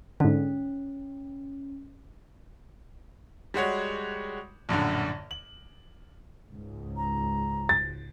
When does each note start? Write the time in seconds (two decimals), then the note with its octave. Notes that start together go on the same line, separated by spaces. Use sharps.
0.20 G#2 D3 C#4
3.54 G3 G#3 F#4 C#5
4.69 A#1 F#2 A2 D3
5.31 F#7
6.49 C#2 G#2
6.97 A#5
7.69 A6